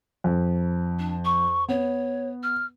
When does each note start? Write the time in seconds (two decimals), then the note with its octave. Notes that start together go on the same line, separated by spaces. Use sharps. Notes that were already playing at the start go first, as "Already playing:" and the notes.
0.24 F2
0.99 D4
1.25 C#6
1.69 B3 C#5
2.43 F6